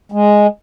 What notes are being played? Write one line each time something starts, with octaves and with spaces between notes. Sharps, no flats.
G#3